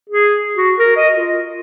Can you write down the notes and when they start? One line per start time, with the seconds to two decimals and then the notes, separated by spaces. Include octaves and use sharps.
0.10 G#4
0.57 F#4
0.79 A#4
0.96 D#5
1.15 F4